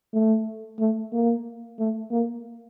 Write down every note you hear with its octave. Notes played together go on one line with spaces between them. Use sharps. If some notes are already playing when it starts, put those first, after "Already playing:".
A3
A3
A#3
A3
A#3